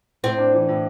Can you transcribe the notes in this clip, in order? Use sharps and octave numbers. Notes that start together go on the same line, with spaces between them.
A2 C4
D4
E3
A2